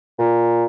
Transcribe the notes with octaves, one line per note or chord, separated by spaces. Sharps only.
A#2